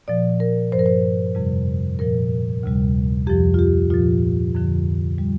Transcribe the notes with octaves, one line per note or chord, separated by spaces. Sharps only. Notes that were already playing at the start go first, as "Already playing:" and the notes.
A#2 F3 D5
A#4
G2 F3 C5
A#4
C5
F2 C3 G3
A#2 F3 A#4
D2 C3 G3
F2 F3 G4
F4
G4
A#2 F3 F4
F2 D3 F3
G3